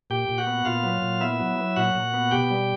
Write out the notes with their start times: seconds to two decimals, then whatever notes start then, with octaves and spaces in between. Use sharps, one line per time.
0.10 A#2 G4 G5
0.29 A#2
0.38 F#4 F#5
0.47 B3
0.65 A#2 F4 F5
0.84 F#3
1.02 A#2
1.20 B3 E4 E5
1.40 F#3
1.58 F#3
1.76 A#2 F#4 F#5
1.95 A#2
2.14 B3
2.31 B2 G4 G5
2.50 G3